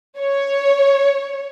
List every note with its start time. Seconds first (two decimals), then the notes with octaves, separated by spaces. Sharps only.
0.18 C#5